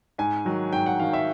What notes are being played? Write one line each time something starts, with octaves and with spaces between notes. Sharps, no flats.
G#2 G#5
D#3 F#3
G#2 G5
F#5
D#3 F#3 F5
E5